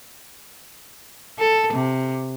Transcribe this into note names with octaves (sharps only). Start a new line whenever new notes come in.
A4
C3